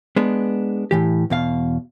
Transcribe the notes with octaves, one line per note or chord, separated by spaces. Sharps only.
G#3 B3 D4
A2 E3 G4
E2 B2 F5